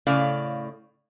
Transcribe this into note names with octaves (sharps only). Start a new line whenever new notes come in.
A2 C#3 D5 F5